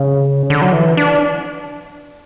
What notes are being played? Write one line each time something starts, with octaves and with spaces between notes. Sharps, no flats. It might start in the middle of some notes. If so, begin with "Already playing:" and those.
Already playing: C#3
D3
F#3
E3
D4